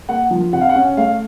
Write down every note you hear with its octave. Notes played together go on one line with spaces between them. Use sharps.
A#3 F#5
F3
C3 F#5
F5
F#5
C#4
A3 F5